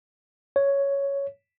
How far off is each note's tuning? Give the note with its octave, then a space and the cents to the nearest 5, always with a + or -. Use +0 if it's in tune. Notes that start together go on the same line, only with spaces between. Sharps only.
C#5 +5